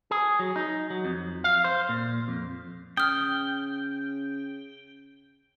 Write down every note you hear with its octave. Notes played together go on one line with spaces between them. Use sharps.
G#4
F#3
D#4
F#3
F2
F5
C5
A#2
F2
C#3 G5 D#6 F6